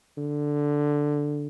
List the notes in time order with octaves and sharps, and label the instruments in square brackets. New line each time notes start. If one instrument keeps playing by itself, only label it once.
[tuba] D3